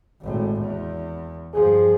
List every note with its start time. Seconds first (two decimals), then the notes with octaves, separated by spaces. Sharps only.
0.21 G#1 A2
0.60 E2
1.54 G2 F3 G#4